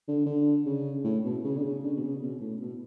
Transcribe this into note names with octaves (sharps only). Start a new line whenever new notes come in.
D3
D3
C#3
A2
B2
C#3
D3
C#3
D3
B2
C#3
B2
A2
B2